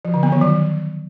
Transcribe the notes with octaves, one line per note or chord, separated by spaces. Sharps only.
F3
D3
B3
D#3
F#3